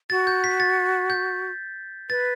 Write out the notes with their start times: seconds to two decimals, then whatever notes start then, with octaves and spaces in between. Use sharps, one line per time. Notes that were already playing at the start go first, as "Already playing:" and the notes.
0.10 F#4 A6
0.27 G6
0.44 B6
0.60 A6
1.10 G6
2.10 B4 A6